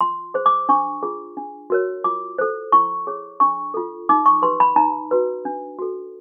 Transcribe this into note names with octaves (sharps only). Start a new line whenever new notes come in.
F4 C6
G#4 C5
D6
D4 C#6
F4 G#4
D4
F#4 A#4 C#5
F4 D6
A4 C5
E4 C#6
G#4 C#5
D4 C#6
F4 A4
D#4 D6
C#6
G4 B4 C6
B5
D#4 A#5
F#4 B4
D4
F#4 A4